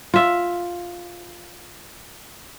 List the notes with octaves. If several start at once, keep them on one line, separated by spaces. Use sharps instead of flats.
F4 E5